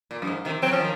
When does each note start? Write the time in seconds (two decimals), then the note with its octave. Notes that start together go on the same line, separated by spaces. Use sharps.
0.11 A#2
0.22 F#2
0.27 G#2
0.45 C3 D#3
0.62 F#3 C4
0.71 F3 C#4
0.80 D#3